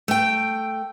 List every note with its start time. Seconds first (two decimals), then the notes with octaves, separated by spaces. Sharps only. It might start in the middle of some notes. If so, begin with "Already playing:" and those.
0.08 A3 G5